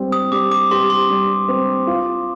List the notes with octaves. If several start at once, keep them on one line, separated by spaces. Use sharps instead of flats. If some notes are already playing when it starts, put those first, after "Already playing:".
Already playing: G3 C4
D#6
G3 D6
D6
G4 C6
C6
G3
C4
F4